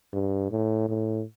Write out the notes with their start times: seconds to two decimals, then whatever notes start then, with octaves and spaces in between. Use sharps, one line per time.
0.13 G2
0.51 A2
0.89 A2